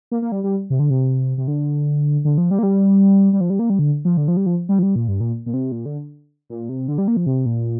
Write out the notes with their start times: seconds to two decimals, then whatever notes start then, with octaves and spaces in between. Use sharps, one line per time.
0.11 A#3
0.22 A#3
0.32 G3
0.44 G3
0.70 C3
0.79 D3
0.90 C3
1.38 C3
1.48 D3
2.25 D3
2.38 F3
2.51 G3
2.59 A#3
2.63 G3
3.33 G3
3.41 F3
3.50 G3
3.59 A#3
3.70 G3
3.79 D3
4.05 F3
4.17 D3
4.28 F3
4.37 G3
4.46 F3
4.69 G3
4.79 F3
4.83 G3
4.96 A#2
5.08 G2
5.20 A#2
5.46 A#2
5.54 C3
5.72 A#2
5.86 D3
6.50 A#2
6.69 C3
6.88 D3
6.98 G3
7.08 A#3
7.17 F3
7.26 C3
7.46 A#2